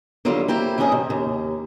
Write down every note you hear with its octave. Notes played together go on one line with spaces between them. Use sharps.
D3 D#3 F#3 G3 F4 G4
A#3 C4 E4 G4
D#3 E3 G3 C#4 G#4 D#5
C3
D#2